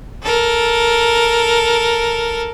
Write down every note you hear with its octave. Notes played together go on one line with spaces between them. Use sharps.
A4 A#4